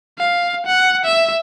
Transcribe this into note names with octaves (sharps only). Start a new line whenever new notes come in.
F5
F#5
E5